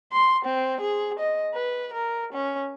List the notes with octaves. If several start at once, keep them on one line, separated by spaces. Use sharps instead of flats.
C6
C4
G#4
D#5
B4
A#4
C#4